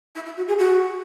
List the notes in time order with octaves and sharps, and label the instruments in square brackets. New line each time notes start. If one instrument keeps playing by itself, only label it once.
[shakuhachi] E4
E4
F#4
G#4
F#4